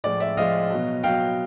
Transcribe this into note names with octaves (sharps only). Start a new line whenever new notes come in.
A2 F3 G#3 D5
D5 E5
A2 F3 G#3 D#5 F5
B2 F#3
B2 F#3 F5 G5